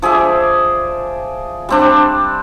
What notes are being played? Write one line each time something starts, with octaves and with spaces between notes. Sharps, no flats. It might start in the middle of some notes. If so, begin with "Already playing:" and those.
F3 G#4 D5 E5
G3 C4 D4